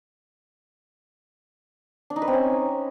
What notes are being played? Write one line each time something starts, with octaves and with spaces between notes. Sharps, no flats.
D4
D#4
B4
C4
C#4